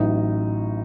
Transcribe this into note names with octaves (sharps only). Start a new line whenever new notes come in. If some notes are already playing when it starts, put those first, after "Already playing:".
Already playing: A1 A2 F#3 D#4